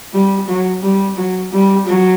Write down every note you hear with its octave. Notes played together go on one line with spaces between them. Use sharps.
G3
F#3
G3
F#3
G3
F#3